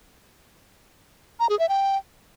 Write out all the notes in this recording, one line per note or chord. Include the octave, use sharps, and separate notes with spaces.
A#5
G#4
E5
G5